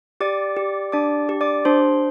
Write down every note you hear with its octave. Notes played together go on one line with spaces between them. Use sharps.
G4 D5 D6
G4
D4 D5 D6
G4
D5 D6
D4 C5 C6